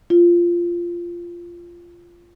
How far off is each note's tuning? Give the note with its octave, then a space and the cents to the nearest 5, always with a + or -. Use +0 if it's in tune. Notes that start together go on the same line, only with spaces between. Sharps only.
F4 -15